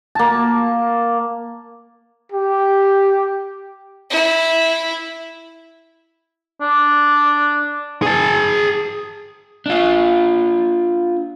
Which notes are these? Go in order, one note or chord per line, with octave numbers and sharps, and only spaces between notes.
A#3 A5
G4
E4
D4
G#4 A5
D4 F4